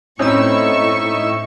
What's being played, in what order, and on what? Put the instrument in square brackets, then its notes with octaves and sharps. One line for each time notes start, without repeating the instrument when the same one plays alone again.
[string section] A2 C#6 [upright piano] C4 C#4 [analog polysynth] D#4 E4 E6